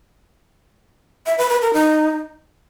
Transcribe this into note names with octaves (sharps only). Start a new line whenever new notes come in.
E5
B4
B4
A#4
D#4